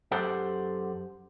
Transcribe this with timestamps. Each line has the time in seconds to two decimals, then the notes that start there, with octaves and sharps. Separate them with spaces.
0.12 F#2 G4 A4 C5 F#5